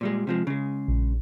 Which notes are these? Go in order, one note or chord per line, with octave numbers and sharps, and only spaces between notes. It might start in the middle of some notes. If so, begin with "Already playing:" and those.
A#2 G3 G#3
C3 F3 G#3
C#3 G#3
A#1